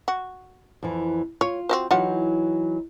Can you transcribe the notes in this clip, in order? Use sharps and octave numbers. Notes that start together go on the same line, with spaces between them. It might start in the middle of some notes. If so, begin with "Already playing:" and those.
F#4
F2 E3
F4 C#5
C4 F#4 C5
E3 F#3 D#4 F4 G4 F#5